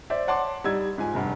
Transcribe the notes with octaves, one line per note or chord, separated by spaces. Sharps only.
C5 D5 E5
C#5 F#5 A5 C6 D6
G3 D#4 E6 G#6
G#2 F3 G#5
F1 G2 F#5